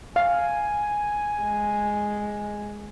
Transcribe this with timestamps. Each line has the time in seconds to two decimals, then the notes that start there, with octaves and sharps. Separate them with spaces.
0.16 F5 G#5
1.42 G#3